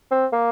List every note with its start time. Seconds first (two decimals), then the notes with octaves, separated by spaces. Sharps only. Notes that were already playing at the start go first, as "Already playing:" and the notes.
0.11 C4
0.33 A#3